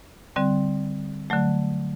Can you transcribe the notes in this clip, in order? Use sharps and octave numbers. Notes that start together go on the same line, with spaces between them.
D3 G3 C4
D3 F#3 A3